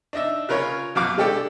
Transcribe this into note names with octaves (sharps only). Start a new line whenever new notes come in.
D4 D#4 D#5 E5
C#3 F4 A#4 B4 C#5
F#2 B2 F#4 F5 D6
G#3 D4 G4 A4 D5